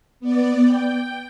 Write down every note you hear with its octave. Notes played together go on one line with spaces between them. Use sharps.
B3 D5
G5